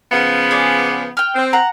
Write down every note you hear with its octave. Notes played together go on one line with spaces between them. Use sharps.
C#3 F3 B3
G#4 D5
G5 F6
C4
F#5 A#5